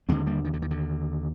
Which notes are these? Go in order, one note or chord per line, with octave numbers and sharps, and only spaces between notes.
D#2 D3 G#3 C4
G3 A#3
D#3
D3
D#3
D3